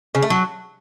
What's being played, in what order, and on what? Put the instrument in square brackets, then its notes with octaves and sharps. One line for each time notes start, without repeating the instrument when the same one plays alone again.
[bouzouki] C#3
A3
F#3